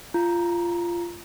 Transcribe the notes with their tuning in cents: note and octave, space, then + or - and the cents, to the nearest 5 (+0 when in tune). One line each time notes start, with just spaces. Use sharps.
F4 -15 A#5 +0